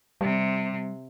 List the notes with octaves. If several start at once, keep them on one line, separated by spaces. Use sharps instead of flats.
C3 G3